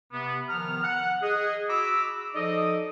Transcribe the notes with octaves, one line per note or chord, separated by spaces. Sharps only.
C3 B3
D#3 F3 B3 A#5 F6
F#5
G#4 D#5
F#4 A#5 B5 D6 E6
F3 D#4 A4 D5 D#5